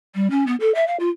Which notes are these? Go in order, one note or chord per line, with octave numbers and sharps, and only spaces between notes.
G3
C#4
B3
A4
E5
F5
F4